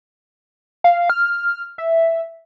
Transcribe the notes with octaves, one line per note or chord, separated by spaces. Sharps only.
F5
F6
E5